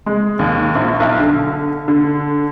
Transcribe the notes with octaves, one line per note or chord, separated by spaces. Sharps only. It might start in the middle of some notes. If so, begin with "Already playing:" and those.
G#3
D#2
A#1
B1
D3
D3